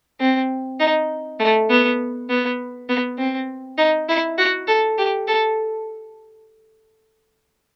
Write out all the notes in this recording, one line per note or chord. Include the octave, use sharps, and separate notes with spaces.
C4
D#4
A3
B3
B3
B3
C4
D#4
E4
F#4
A4
G4
A4